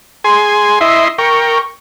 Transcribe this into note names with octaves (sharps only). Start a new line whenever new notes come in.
G#4 G#5 C6
E4 D#5 E5 C6
A#4 G5 C#6